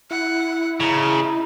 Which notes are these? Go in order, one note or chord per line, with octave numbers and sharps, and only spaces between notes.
E4 F#5
C#3 D#4